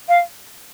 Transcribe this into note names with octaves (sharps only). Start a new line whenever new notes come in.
F5